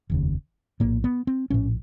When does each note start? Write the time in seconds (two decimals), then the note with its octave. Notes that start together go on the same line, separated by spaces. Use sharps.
0.10 F1 D#2 C#3
0.80 A#1 A2 A#3
1.04 B3
1.27 C4
1.50 A#1 A2 C#4